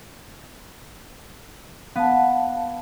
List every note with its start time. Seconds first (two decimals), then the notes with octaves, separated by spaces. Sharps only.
1.96 B3 F5 A5